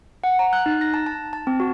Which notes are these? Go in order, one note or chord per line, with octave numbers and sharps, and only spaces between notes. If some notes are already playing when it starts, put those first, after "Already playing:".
F#5
A#5
F#6
D#4
A#6
A5
A5
A5
C4
F#4